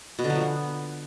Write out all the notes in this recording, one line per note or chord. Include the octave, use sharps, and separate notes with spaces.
B2
D3
F#3
F3
B3